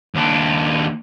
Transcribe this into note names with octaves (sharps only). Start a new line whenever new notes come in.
D#2 D4